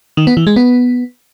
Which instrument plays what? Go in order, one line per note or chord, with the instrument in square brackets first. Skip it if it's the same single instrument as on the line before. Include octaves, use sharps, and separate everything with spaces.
[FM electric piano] D#3
B3
E3
G#3
B3